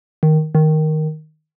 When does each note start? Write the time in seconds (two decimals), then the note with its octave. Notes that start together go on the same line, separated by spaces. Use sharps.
0.23 D#3
0.55 D#3